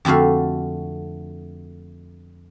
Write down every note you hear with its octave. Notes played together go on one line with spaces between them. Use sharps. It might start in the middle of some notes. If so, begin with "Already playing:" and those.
F2 D3 A3 F#4 F5